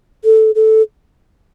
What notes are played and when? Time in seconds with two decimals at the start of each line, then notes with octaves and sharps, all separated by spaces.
0.25 A4
0.55 A4